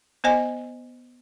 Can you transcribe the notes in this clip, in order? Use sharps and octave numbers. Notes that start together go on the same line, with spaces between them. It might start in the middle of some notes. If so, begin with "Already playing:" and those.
B3 C5 D#5 G#5